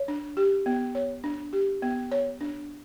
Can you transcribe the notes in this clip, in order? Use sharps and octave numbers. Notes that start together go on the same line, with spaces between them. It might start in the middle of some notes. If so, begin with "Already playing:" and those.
Already playing: C#5
D4
G4
B3
C#5
D4
G4
B3
C#5
D4